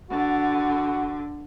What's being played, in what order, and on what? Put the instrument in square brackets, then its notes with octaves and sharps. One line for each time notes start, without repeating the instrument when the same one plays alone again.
[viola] D3 [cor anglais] F#4